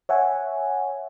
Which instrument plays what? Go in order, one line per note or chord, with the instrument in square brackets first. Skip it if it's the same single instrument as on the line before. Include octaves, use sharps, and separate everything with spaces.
[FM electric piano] C#5 E5 F#5 G#5